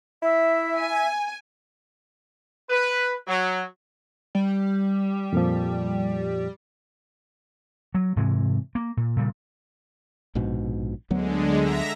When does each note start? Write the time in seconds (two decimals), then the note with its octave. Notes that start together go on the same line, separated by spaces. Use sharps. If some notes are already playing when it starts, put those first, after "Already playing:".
0.23 E4 E5
0.77 G#5
2.69 B4
3.27 F#3
4.35 G3
5.33 F2 A#2 F3
7.95 F#3
8.16 G#2 C3 E3 G#3
8.75 A#3
8.97 A#2
9.17 A#2 C#3 G3
10.35 A#1 G#2 B2
11.11 D2 D3 F#3 G#3 B3
11.60 E5 A#5 A#6